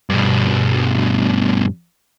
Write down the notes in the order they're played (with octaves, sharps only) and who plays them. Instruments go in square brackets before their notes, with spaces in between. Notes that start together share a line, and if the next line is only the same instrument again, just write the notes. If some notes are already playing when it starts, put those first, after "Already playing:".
[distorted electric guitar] G2 B2